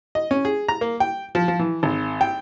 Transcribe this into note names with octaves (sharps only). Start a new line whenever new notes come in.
D#5
C#4
G#4
A#5
A#3
G5
F3
F3
E3
G#1
G5